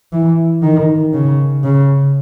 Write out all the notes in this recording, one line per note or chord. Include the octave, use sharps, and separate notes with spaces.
E3
D#3
C#3
C#3